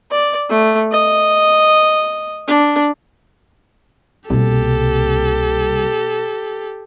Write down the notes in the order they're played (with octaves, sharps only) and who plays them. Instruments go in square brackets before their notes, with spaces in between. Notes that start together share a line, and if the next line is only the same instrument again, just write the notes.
[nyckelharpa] D5
A3
D#5
D4
[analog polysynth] C2 [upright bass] B2 A#3 [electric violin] G4 A4